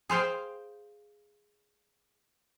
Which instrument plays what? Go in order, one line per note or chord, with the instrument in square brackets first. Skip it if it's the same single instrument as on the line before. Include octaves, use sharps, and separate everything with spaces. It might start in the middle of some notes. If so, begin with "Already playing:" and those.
[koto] G#4 C5 F5 G5